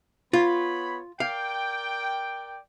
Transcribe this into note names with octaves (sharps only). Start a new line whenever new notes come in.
B3 F4 C#5 B5
A#4 D5 F5 G5